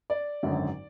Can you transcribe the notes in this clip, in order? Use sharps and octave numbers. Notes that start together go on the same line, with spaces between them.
D5
G#1 F#2 D3 F#3